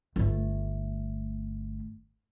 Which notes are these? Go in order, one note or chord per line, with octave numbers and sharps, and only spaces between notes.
G1 A3